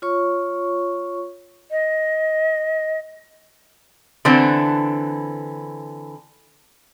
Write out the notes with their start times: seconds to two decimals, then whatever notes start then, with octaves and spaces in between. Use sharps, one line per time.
0.02 F4 C#5 C#6
1.71 D#5
4.25 D3 E3 B3 C4